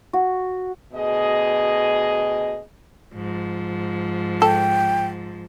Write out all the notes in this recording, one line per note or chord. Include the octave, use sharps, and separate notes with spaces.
F#4
D2 B2 G#4 D#5
G#2 F3
A4 G5